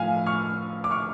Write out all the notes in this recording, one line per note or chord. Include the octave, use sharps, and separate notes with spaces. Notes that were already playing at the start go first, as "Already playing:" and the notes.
Already playing: A2 F3 F5 G#5
C#6 F6
D6
C#6 F6